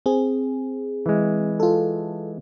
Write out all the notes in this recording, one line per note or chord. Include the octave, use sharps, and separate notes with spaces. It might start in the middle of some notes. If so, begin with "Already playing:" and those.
C4 G#4
E3 G#3
F4 A4